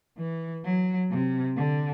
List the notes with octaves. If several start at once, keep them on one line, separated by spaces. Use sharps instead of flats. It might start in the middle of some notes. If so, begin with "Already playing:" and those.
E3
F#3
C3
D3